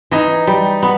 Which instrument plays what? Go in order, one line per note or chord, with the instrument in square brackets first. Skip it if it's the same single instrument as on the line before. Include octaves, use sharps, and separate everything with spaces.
[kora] E3 [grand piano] D#4
[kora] G3
B3